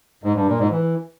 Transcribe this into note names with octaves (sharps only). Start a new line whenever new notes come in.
G#2
G2
A#2
G#2
E3